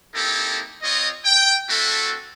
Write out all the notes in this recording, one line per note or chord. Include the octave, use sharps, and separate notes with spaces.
A#3 C4 D#4 E4 G4 A4
C4 F4 C#5 D#5
G5
A3 C4 D4 E4 F#4 A4